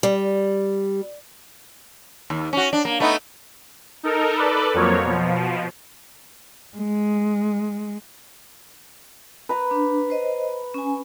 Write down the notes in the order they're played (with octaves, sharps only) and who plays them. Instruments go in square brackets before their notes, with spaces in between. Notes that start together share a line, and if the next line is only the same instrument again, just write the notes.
[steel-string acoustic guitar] G3
[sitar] D#2
C#4 F#4
D4
A#3
A3 B3 D#4
[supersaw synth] D#4 A4 A#4
A4 B4 D5
F2 F3 F#3 A#3 C#5
B2 F3
[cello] G#3
[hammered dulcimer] B4 A#5
[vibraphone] D4
C5 D#5
C#4 G#5